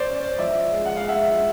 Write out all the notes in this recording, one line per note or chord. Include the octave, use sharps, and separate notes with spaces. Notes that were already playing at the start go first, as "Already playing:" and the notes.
Already playing: C5 D5
C#4
F3 D5 E5
G#3
F#5
G#3 F5
E5 F#5
F3